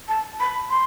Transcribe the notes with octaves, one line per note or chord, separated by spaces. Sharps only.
A5
B5
C6